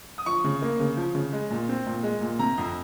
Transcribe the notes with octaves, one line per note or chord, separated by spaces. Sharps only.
D#6
F3 C#6
C#3
A#3
C#3
F3
C#3
G#3
A#2
C4
A#2
G#3
A#2
C3 A#5
F2